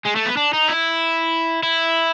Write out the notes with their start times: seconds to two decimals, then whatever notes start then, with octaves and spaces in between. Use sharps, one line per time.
0.06 G#3
0.16 A3
0.26 B3
0.37 D4
0.53 D#4
0.68 E4
1.63 E4